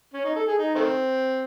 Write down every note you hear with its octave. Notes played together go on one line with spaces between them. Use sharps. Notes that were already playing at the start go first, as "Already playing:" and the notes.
C#4
D#4
A4
G#4
D#4
D#3 A3 C4